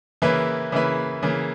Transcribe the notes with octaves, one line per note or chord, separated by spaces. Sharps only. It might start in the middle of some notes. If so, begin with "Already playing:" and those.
C#3 E3 A#3 E4 B4
C#3 E3 A#3 E4 B4
C#3 E3 A#3